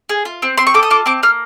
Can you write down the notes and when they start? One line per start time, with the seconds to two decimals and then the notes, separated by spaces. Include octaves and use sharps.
0.09 G#4
0.25 F4
0.42 C4
0.58 C4 C6
0.67 C#6
0.74 A4 D6
0.83 D#6
0.91 F4 D6
1.06 C4 D6
1.23 A#3 F6